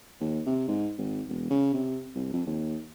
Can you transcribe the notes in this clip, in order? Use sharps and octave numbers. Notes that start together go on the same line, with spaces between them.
D#2
C3
G#2
G#1
E1
C#3
C3
C2
F2
D#2